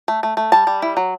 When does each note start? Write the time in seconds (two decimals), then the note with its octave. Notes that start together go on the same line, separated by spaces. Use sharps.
0.08 A3
0.23 A3
0.37 A3
0.52 G3 A5
0.67 G3
0.82 E4
0.97 F#3